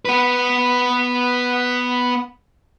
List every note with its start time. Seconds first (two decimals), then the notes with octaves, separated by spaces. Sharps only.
0.05 B3 B4